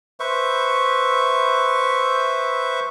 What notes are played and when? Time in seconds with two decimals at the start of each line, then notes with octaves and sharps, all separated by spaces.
0.20 B4 C5 E5 C#6